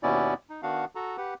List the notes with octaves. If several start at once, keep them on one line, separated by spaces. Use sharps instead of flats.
D#2 B2 B3 C#4 E4 D5
D#4
D#3 B3 D4 F#4 F5 F#5
F#4 A4 A#5
G4 B4 F#5